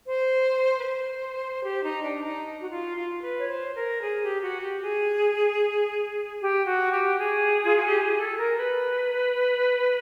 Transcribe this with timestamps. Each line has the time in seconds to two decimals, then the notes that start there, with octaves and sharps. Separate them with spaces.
0.05 C5
0.80 B4
0.84 C5
1.64 G4
1.83 D#4
2.03 D4
2.23 D#4
2.62 F#4
2.69 F4
2.96 F4
3.22 B4
3.38 C#5
3.49 C5
3.75 A#4
4.02 G#4
4.22 G4
4.41 F#4
4.61 G4
4.81 G#4
6.40 G4
6.66 F#4
6.92 G4
7.19 G#4
7.64 F4
7.75 F#4
7.87 G4
7.98 G#4
8.18 A4
8.38 A#4
8.58 B4